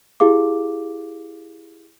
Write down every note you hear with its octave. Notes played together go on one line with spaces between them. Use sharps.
E4 G4 G#4 F5 D6